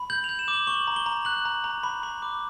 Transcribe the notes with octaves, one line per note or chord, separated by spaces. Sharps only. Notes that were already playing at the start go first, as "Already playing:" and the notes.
Already playing: B5
G6 F#7
F7
G6
E7
D6
F#7
C#6 F#7
A#5
G7
A#5
F#6 F#7
A#5
A#5
B5
B5
D6